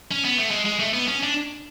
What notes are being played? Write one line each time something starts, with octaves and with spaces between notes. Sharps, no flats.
C#4
B3
A3
G#3
G#3
A3
B3
C#4
D4